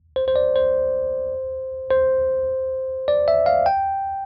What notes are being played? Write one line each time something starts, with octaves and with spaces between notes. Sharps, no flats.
C5
C5
D5
C5
C5
D5
E5
F5
G5